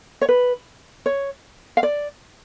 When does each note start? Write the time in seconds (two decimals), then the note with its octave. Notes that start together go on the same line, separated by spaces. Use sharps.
0.21 C#5
0.29 B4
1.06 C#5
1.77 F5
1.83 D5